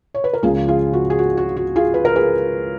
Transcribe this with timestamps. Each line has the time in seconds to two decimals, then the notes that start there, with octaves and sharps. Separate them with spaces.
0.14 C#5
0.24 B4
0.33 A#4
0.43 C#2 C#3 F3 F4 G#4
0.68 F4 G#4
0.93 F#4
1.10 G#4
1.19 F#4
1.37 F#4
1.56 F#4
1.76 F4 G#4
1.94 B4
2.05 A#4
2.16 G#4 B4